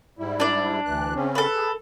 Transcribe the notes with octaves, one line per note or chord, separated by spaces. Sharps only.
G#2 G3 E4
D4 D5
D2 E3 F#6
C#3 C4 C#4
A4 B4
G#4